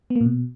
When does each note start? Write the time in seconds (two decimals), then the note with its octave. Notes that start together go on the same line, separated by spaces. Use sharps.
0.10 B3
0.16 A#3
0.21 A#2
0.26 B2